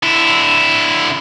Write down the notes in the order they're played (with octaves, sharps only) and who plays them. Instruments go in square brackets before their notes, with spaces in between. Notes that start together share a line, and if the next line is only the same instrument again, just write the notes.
[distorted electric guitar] D3 E4